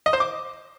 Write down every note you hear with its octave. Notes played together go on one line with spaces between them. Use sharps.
D#5
C5
D6